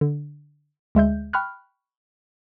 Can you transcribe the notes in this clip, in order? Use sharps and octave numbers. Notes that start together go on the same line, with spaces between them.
D3
D2 G#3 E5 G6
G5 B5 C#6 F6 F#6